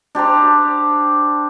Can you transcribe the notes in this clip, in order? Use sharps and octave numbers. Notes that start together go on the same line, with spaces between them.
D4 G4 C5 A#5